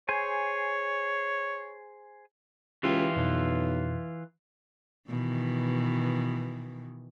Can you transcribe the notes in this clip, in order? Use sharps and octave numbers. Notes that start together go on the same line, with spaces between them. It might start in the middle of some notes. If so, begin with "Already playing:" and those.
G#4 C5 C#5 G#5
C#2 E3 F4 G4 G5
B1 F2 B2
B2 D#3 E3